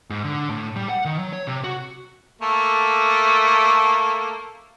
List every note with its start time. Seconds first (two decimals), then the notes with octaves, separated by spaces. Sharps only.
0.10 G#2
0.24 D3
0.50 A2
0.76 G3
0.89 F#5
1.05 D#3
1.19 F#3
1.33 C#5
1.47 C3
1.64 F#4
2.42 A3 A#3 A4